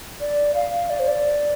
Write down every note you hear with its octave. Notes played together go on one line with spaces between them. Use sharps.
D5
F5
D5
C5
D5